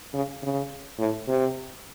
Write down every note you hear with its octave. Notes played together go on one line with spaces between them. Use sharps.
C#3
C#3
A2
C3